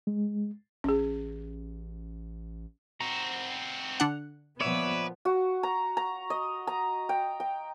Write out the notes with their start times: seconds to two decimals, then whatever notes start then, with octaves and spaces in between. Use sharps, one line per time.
0.07 G#3
0.84 A1 C#4 G#4
3.01 C4 F#4 A#5
4.00 D3 D4 F#5
4.61 A#2 F3 B3 B4 C#5 D5 E5
5.25 F#4
5.63 A#5
5.97 A#5
6.30 D#5
6.67 A#5
7.09 G5
7.40 G5